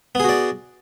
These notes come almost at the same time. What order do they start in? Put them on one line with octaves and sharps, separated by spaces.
B3 G#4 F#4 D5